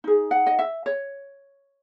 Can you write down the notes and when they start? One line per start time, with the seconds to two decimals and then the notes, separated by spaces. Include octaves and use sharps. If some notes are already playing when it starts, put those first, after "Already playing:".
0.04 D#4 G#4
0.31 F#5
0.46 D#5
0.59 E5
0.86 C#5